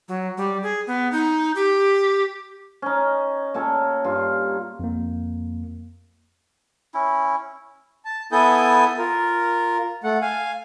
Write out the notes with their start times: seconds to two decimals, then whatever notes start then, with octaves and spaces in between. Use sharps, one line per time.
0.08 F#3
0.37 G3
0.63 G#4
0.87 B3
1.12 D#4
1.55 G4
2.82 C#4 D#4
3.54 A#2 C#4 A4 C#5
4.04 G2 F4
4.80 F2 A#3
6.94 C#4 E4
8.05 A5
8.32 B3 E4 A4 G#5 D#6 G6
8.98 F4 A#4
10.04 A3 F#5
10.22 F5 G#5